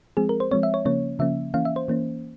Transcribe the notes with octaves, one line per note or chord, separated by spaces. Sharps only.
F3 G#3 C4 G#4
A#4
C5
F3 G#3 C4 C#5
E5
C#5
C#3 F3 A#3 C#4 C#5
C#3 F3 A#3 C#4 E5
E3 A#3 C#4 F5
E5
C5
E3 A#3 C#4